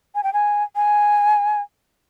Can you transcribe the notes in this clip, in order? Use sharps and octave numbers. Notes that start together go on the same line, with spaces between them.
G#5
G5
G#5
G#5